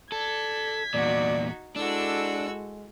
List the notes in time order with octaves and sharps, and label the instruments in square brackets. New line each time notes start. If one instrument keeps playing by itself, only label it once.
[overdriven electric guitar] A4 [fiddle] D5 [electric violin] G#6 B6
[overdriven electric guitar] E2 A#2 [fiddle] D#4 F#4 [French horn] D5
[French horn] G#3 [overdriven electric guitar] D4 [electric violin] E4 A4 [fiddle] F#4 E6